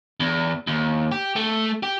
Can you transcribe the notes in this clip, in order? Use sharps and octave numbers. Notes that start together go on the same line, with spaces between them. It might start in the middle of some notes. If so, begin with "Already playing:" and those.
E2
D#2
G4
A3
G4